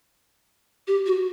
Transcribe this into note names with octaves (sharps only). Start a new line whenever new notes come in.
G4
F#4